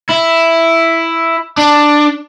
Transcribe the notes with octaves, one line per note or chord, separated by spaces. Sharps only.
E4
D4